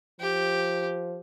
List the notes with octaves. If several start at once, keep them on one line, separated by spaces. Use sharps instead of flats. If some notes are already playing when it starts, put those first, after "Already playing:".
F3 G4